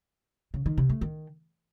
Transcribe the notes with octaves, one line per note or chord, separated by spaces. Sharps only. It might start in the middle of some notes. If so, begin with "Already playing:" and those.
C#3
D#3
C3
A3
D#3